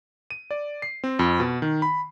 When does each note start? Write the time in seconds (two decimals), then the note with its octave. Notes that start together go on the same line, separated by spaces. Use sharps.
0.31 D#7
0.51 D5
0.82 C7
1.04 C4
1.19 F2
1.40 B2
1.62 D#3
1.82 B5